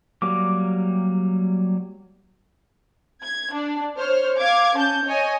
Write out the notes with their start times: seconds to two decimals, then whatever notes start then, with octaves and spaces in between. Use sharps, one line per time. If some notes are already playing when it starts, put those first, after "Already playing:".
0.22 F#3 G3 A#3 D6
3.23 G#6
3.53 D4
3.97 C5 C#5 F6
4.37 F5 D6 G#6
4.76 C#4 A5 G6
5.05 C#5 D#5 G#5